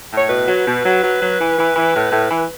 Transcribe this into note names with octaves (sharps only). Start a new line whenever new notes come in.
A2
C#5
B2 B4
F#3
B2
F#3
F#3
F#3
E3
E3
E3
A2
A2
E3